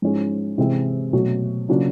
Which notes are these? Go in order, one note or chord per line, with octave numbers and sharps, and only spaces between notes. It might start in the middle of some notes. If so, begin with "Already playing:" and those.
G#2 F3 G#3 C#4 E4
C3 E3 G#3 C4 E4
B2 F#3 A3
C#3 F#3 A#3 D4 F4